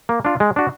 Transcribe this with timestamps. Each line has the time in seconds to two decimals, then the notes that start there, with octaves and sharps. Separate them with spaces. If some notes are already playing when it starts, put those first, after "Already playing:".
0.09 A#3
0.25 D4 F4
0.40 G#3
0.56 D4 F#4